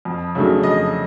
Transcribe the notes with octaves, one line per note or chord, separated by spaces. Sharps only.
F2
C#3 F#3 A3 D4
F2 D#5